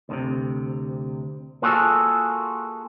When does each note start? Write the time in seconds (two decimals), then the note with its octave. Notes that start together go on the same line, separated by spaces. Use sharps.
0.09 D2 A2 C3
1.62 A#3 F4 F#4 G#4 A4